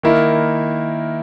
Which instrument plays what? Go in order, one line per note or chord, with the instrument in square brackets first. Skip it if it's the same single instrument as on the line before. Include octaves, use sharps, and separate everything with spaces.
[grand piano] D#3 A#3 E4